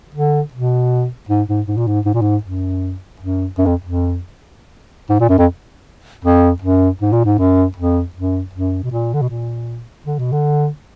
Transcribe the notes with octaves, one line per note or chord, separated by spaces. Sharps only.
D3
B2
G#2
G#2
G#2
A#2
G#2
G#2
A#2
G#2
F#2
F#2
F#2
F2
F2
G#2
A#2
F#2
F2
F2
F#2
G#2
A#2
G#2
F#2
F2
F#2
F#2
B2
A#2
D3
B2
A#2
D3
B2
D3